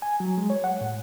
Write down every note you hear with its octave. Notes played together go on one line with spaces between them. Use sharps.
G#5
F#3
G#3
C#5
F#5
A2